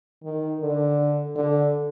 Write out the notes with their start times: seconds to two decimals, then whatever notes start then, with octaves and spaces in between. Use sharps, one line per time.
0.23 D#3
0.61 D3
1.36 D3